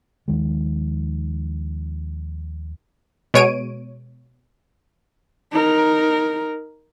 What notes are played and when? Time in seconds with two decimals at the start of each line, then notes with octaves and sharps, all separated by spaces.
0.28 D#2 D#3 F3 G#3
3.34 B2 G#3 C#5 D7 D#7
5.52 D#4 A#4